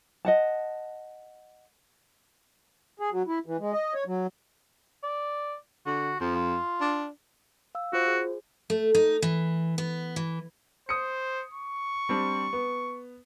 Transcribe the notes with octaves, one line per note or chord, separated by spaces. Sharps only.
D#5 F#5 A5
G#4
F#3
E4
E3
G#3
D#5
C#5
F#3
D5
D3 F#4
F2 F3
F4
D4
F5 E6
F4 F#4 C5
G#4
A3
D#4
E3
B3
E3
C5 D#6 C#7
C#6
G3 C4 D4
B3